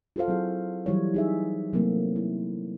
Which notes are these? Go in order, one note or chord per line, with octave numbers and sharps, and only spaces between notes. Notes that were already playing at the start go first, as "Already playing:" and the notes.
F4 F#4 A4 C5 F5
F#3 C4 E4 G#4
E3 F#3 G3 E4 C#5
D#4 G#4 E5
C3 F#3 A3 A#3 C4
E4